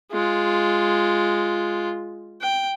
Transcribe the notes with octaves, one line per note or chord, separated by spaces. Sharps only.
G#3 F4
G5